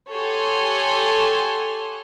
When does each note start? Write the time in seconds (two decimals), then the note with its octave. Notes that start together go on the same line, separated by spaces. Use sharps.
0.10 G4 A4 C#5 F#5 G#5 C6